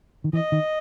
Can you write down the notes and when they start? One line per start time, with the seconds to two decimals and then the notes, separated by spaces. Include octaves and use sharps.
0.24 D#3
0.33 E3 D#5
0.52 D#3